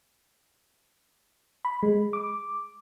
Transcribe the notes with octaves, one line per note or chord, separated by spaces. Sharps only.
B5
G#3
D6